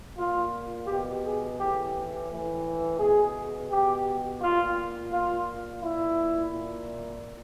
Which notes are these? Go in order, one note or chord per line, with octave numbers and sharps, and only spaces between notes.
A#2 F4
B2 G4
G#4
A2 E3 G4
A2 E3
B2 G#4
B2 G4
A#2 F4
A#2 F4
A#2 E4
A#2